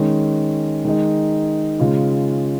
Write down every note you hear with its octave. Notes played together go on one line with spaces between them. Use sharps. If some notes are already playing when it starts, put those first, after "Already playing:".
Already playing: D#3 G#3 C#4
D#3 G#3 D#4
C#3 G#3 C#4 F4